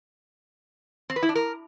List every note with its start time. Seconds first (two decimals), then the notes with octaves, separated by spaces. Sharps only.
1.10 C4
1.16 B4
1.23 E4
1.29 D4
1.35 A#4